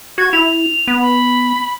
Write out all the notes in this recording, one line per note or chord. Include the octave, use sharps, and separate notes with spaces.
F#4 G#6
E4 F7
B3
B5